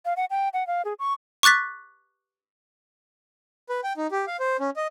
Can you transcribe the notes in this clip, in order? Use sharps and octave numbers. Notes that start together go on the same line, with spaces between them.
F5
F#5
G5
F#5
F5
G#4
C#6
C#6 D6 F#6 A6 B6
B4
G5
D#4
G4
F5
C5
C#4
D#5